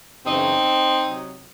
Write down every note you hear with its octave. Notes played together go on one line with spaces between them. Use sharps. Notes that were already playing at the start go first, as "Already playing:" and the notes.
F#2 C#3 E3 C4 D#4
C3 F#3